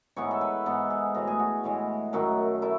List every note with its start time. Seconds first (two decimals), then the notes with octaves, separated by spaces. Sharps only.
0.16 G#2 E3 B3 C#5
0.31 A4
0.41 B4
0.66 G#2 E3 B3 A4
0.90 G#4
1.15 A2 E3 G#3 F#4
1.27 G#4
1.39 F#4
1.64 A2 E3 G#3
2.13 F#2 D#3 A3 F#4
2.62 A3 E4